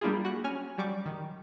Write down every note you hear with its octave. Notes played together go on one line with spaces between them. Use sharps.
G3 A#3 D4 E4 F4 G#4
F#4 F#6
C#4 G#5 F6
F#3 G3 C#6 D6
D#3